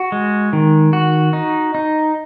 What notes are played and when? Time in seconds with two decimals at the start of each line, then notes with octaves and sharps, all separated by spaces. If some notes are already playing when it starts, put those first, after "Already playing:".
Already playing: F#4
0.12 G#3
0.53 D#3
0.93 F#4
1.33 D#4
1.75 D#4